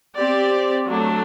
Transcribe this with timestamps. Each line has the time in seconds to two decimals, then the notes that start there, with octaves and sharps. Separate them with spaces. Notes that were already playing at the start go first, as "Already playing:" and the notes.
0.16 C4 G4 D5
0.87 F#3 A3 D4